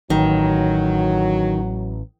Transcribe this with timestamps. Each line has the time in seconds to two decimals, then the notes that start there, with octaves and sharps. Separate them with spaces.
0.10 A1 D#3 F#3